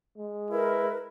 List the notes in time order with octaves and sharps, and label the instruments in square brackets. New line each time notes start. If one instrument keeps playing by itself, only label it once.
[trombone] G#3
[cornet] E4 [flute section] A#4 B4